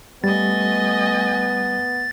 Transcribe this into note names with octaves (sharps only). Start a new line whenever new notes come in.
G3 A3 B3 D#5 G#5 A6